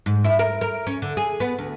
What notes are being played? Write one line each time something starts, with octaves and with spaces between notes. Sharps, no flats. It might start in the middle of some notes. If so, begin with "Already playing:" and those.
G#2
E4
A#4
A#4
C#4
D3
G#4
B3
D2